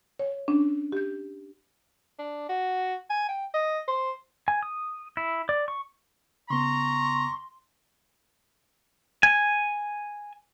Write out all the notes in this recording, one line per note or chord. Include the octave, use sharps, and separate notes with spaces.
C#5
C#4 D4
G4 G6
D4
F#4
G#5
G5
D#5
C5
G#5
D#6
E4
D5
C#6
C#3 B3 A#5 C6 C#6
G#5